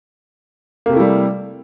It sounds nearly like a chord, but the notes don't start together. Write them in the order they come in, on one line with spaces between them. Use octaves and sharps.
A#3 C3 A3 E4 G3